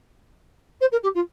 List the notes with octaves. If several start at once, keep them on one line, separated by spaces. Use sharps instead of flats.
C5
A#4
G4
F4